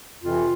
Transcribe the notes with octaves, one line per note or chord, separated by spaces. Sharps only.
F2 C3 E3 F4